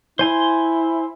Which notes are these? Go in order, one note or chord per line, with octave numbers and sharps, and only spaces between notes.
E4 C5 G#5 C6